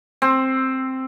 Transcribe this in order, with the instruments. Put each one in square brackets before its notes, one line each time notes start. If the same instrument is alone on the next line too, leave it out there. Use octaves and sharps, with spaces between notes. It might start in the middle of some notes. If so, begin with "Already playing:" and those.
[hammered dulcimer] C4